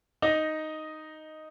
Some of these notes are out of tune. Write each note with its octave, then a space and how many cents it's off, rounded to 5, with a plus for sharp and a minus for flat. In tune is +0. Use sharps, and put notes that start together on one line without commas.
D#4 +0 D#5 +0